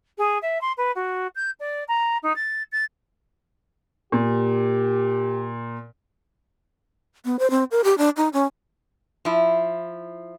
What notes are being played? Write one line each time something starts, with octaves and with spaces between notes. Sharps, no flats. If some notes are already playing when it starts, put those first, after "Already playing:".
G#4
E5
C6
B4
F#4
G6
D5
A#5
D#4
A6
A6
A#2 G4
B3
C5
C4
A#4
G4
D4
D#4
C#4
F3 E4